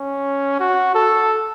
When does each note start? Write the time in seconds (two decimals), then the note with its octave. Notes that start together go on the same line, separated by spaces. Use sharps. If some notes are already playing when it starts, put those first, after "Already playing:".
Already playing: C#4
0.60 F#4
0.95 A4